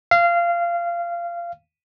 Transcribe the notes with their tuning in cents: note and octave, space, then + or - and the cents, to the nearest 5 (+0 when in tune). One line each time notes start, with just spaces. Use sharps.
F5 -20